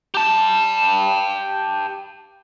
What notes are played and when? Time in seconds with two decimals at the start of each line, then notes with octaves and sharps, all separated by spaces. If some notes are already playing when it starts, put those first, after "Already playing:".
0.14 G4 A5